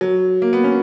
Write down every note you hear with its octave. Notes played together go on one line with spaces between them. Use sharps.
F#3
A#3
B3
C#4